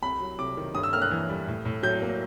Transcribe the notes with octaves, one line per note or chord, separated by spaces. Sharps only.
C2 B5
F#3
C3 D6
D#3
G2 D#6
E6
A#3 F6
F#6
E3
G3
A2
A2
F#3 G6
A#3